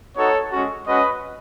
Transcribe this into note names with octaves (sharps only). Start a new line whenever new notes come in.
B3 D#4 F#4 A4 C#5
G#3 C#4 F#4
G#3 C#4 F#4 B4 D#5